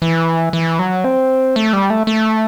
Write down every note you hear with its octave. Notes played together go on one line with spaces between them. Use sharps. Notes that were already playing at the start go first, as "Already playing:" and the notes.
E3
E3
F#3
C4
A3
G3
A3
A3